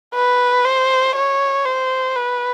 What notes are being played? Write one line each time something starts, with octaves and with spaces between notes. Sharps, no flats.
B4
C5
C#5
C5
B4